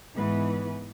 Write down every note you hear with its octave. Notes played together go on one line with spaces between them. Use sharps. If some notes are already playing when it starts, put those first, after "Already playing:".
G#2 E3 G#3 B3 B4